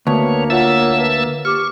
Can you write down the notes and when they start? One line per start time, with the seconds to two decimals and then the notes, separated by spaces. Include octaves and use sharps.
0.07 D2 A#3 B3 C#5 A5
0.50 F4 C#5 E5 F#5 A5 E6
0.99 B4
1.45 G4 C#6 D6 F6